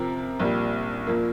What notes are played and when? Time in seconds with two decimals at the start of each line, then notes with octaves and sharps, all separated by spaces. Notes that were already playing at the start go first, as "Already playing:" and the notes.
Already playing: C3 F3 C4 A#4
0.40 A#1 A#2 G3
1.07 A#2 F3 A#3